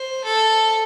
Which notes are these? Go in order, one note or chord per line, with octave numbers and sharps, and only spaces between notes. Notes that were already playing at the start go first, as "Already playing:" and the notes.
Already playing: C5
A4